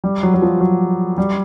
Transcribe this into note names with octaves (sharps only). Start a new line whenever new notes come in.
G3
F#3
F#3
F3
F#3
G3